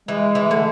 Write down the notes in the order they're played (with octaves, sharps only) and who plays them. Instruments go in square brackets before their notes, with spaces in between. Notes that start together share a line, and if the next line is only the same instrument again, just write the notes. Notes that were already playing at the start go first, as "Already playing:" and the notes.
[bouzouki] E3 [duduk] G#3
[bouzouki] E3
[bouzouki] D3 [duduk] A3